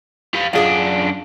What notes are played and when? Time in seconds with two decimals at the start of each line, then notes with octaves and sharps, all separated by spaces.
0.34 G4 F5
0.53 F#2 D4 F4 G#4 D5